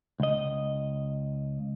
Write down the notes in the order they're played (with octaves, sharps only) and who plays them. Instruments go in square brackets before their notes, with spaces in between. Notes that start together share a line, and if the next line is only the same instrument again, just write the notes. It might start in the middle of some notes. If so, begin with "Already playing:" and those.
[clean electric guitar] C#2 D#5